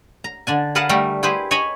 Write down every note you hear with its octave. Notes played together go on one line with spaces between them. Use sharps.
A#5
D3 D4 G#5
G#4 A#4 B4 F5 F#5 A5
G3 A3 G4 A#4
E4 G4 G#4 B4 C5
C#5 D#5 G#5 A#5 B5